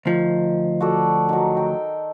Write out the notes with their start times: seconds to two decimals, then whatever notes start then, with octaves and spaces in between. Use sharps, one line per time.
0.06 D2 D#3 F3
0.81 F#4 A4 D5
1.29 D#3 F#3
1.57 G5